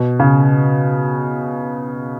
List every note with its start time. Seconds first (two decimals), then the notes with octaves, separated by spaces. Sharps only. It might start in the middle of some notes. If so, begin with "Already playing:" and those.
Already playing: B2
0.19 C#3